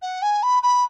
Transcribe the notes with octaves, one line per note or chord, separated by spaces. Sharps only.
F#5
G#5
B5
B5